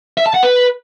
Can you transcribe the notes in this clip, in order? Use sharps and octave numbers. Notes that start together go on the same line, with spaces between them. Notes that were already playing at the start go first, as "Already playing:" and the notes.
E5
A5
F#5
B4